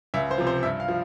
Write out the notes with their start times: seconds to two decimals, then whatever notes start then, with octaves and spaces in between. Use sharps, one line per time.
0.14 C#2 E5
0.31 C5
0.38 C3 F3
0.47 C5
0.63 G2 E5
0.80 F5
0.88 F3